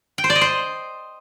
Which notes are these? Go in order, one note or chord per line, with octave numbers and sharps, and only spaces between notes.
G5
C5
D5
D#5
C5